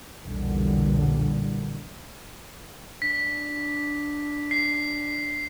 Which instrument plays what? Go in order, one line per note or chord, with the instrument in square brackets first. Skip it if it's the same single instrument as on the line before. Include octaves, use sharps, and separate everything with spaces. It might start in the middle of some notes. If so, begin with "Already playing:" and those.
[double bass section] B1 E2 A#2 D3 G3
[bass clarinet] D4 [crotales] B6
[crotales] C7